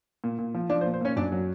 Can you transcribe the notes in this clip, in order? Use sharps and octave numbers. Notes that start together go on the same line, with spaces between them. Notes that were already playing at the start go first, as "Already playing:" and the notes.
A#2
A#2
F3
F3 D4 D5
C5
A#2
C5
A#2 C#4 C#5
F#2 D4 D5
F#3